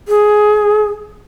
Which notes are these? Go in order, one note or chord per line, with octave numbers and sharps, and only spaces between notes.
G#4